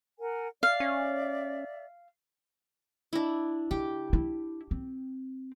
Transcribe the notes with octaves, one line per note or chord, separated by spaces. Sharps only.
A#4 F#5 G#5
D5 E5 F5
C#4
D4 E4
C#3 G4
E4
C4